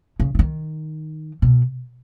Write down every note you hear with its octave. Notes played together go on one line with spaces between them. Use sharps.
C#3
E3
D#3
B2